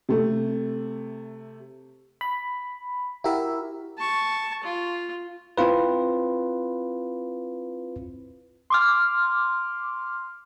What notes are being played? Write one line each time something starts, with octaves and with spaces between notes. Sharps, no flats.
C3 A3
B5
E4 F#4 G4 A#4 E5
A5 C#6
F4
C4 E4 F4 B4
C6 D6 F6